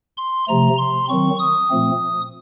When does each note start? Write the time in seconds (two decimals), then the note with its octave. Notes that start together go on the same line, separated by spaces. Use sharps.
0.17 C6
0.48 C3 F3 A3 A#5
0.78 C6
1.09 D#3 F#3 C4 C#6
1.39 D#6
1.70 A#2 F3 A3 C4